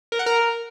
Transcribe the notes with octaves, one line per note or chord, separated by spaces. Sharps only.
A#4
F#5
A#4